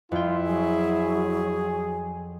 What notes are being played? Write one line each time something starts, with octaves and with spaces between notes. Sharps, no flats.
F2 E4 F4 G5
F#3 G#4